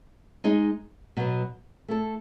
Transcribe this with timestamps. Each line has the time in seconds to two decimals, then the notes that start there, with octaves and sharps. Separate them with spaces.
0.44 G#3 D#4 G#4 D#5
1.17 B2 F#3 B3
1.88 A3 E4 A4